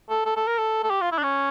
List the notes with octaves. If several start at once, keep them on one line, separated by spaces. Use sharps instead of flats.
A4
A4
A4
A#4
A4
A4
G4
F4
E4
D4
C#4